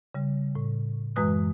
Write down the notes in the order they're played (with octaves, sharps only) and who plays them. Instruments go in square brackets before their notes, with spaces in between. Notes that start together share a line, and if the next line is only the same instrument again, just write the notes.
[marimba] C#3 G3
A2
F#2 E3 G#3 B4 D#6 F#6